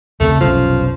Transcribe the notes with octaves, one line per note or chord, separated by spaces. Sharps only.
D#2 C#3 A3 C4
F1 B1 F3 C#4